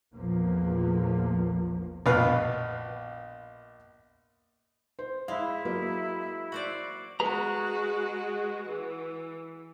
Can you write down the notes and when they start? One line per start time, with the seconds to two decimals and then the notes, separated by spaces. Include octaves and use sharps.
0.16 A#1 E2 F3 A3 A#3
2.06 A#1 B2 B4 F5
4.99 C5
5.28 G#3 E4 F5
5.65 F#3 A#3
6.52 F#4 C5 D5
7.20 G#3 F#4 G#4 B4 A#5
8.67 E3